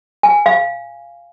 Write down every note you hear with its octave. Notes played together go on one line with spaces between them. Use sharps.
G#5
F5